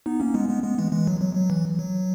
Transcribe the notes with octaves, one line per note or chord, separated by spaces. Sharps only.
B3 D#4
A#3 C#4
G#3 B3
G#3 B3
G#3 B3
E3 G#3
E3 G#3
F#3
F#3
F#3
E3
F#3